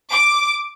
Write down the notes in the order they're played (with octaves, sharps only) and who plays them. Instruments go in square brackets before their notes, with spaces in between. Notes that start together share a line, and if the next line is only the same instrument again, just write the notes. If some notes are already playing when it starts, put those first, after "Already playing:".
[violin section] D6